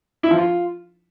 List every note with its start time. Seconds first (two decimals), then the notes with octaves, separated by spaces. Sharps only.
0.23 E4
0.31 F3
0.38 F4